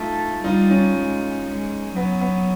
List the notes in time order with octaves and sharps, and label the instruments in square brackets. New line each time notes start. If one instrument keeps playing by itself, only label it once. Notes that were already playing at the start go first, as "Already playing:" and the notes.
Already playing: [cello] A3 [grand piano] D#4 F4
[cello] G3 [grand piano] D#4 F4
[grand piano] C#4 D#4
[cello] G#3
G#3
[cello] F#3 [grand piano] B3
[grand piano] B3